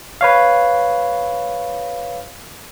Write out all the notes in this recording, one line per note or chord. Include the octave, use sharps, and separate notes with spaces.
B4 C#5 F5